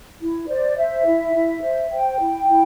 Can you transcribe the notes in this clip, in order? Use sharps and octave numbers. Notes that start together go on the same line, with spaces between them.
E4
C5 D5
C5 E5
E4
E4
C5
C5 G5
E4
E4